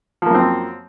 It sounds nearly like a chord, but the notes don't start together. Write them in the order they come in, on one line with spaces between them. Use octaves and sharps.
F3 A#3 F#2 C4